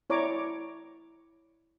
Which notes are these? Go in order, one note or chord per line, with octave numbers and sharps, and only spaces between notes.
E4 C#5 D5 A#5 D6